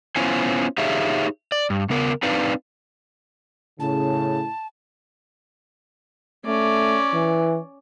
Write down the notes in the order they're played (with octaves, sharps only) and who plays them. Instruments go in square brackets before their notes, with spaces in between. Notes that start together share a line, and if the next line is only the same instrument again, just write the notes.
[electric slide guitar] B3 C#4 E4 F4 C5 G#5
D#4 G4 G#4 C#5 E5 F5
D5
G2
C#3 B3 A#4
C4 D4 D#4 B4 D5 F5
[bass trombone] A2 [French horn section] C#3 [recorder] A5
[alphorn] A3 [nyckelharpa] C#4 D5
[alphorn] E3